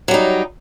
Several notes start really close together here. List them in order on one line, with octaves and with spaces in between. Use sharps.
F#3 G3 D#4